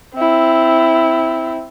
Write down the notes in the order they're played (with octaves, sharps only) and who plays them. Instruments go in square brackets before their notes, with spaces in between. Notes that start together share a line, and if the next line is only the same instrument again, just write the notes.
[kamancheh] C4 E4